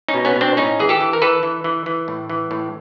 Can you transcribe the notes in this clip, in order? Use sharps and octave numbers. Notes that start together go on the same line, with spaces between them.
C#4 D#4
B2
B3 C#4
B2
C4 D4
A2 C#4 D#4
E3 G#4
G4 A4
E3
A#4
E3 A4 B4
E3
E3
E3
A2
E3
A2